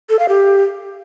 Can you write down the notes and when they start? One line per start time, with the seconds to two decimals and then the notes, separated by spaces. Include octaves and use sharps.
0.10 A4
0.19 F5
0.29 G4